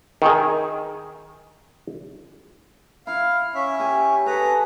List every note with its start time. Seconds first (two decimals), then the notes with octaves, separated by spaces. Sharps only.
0.22 D#3 G#4
3.07 E4 F5
3.55 C#4 E5
3.80 G4 G#5
4.26 G#4 A4 B4 A#5